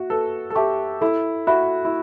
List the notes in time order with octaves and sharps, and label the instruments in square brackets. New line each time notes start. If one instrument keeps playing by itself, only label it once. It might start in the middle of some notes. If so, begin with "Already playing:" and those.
Already playing: [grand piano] F#4 [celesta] E5
[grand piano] A4 [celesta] B4
[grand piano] A4
[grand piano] G4 [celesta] E5 A5 C#6
[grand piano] E4 [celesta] A4
[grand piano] F#4 [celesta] E5 B5
[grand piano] E4